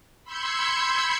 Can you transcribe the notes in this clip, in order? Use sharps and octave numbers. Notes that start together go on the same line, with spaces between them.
B5 C6 E6 G6 G#6 C#7